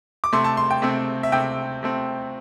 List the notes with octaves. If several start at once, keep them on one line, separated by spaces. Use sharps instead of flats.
D6
C3 A3 C4 C6
A5
C6
G5
C3 A3 C4
E5
C3 A3 C4 G5
C3 A3 C4